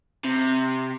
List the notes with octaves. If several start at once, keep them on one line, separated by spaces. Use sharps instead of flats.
C3